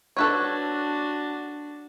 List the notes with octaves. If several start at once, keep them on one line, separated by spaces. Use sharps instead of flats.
D4 F#4 A4 B4 C#5